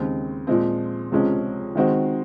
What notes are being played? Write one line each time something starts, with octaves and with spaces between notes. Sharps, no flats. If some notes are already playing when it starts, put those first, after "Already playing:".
Already playing: D#2 C#3 G#3 C4
A#2 F3 G#3 C4
C#2 C3 F3 G#3 C#4
D#3 G#3 C4 F#4